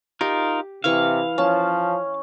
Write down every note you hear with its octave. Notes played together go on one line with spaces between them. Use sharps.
D#4 F4 G4 A#4
C3 E3 E4 F5 C#6
F3 C#4 A5